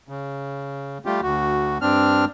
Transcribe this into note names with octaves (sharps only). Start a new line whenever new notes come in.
C#3
G3 A3 F4 G4
D2 F#4
G2 C4 D4 F6